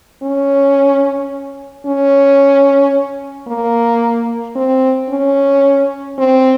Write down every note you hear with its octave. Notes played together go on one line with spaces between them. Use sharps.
C#4
C#4
A#3
C4
C#4
C4